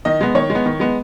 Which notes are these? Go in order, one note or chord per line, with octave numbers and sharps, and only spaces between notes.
D#3 D#5
G#3 B3
D#3 C#5
G#3
B3
D#3
G#3 B3